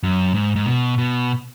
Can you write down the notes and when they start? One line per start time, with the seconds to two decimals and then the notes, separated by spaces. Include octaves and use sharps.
0.03 F#2
0.34 G#2
0.56 G#2
0.66 B2
0.98 B2